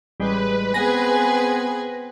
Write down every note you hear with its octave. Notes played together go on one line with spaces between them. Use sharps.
A1 G3 G#3 B4
B3 C4 G#4 G#5 A#6